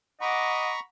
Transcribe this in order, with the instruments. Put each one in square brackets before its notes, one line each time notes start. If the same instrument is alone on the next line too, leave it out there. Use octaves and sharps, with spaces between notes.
[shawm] D#5 [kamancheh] F#5 D6 [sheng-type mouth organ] A#5 B5 C#6